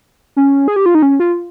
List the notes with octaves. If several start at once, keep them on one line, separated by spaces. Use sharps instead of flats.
C#4
G#4
G4
F4
D#4
C#4
F4